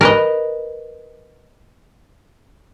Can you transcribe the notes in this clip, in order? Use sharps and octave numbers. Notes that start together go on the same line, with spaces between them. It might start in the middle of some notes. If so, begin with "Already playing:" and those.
A#4 B4 D#5